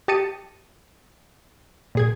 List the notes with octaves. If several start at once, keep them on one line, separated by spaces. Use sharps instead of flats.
G4 D#5 A5 C#7 D#7
A#2 G#4 G#6